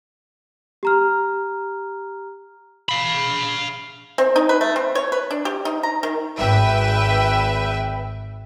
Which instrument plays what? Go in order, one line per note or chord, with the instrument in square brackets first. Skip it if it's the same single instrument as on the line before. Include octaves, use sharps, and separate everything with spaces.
[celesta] G4 A#5 F6
[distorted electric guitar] F5 B5
[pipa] C4
D#4
B4
A3
C4
C#5
B4
D4
G4
D#4
A#5
D#3
[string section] G#1 B4 E5 G5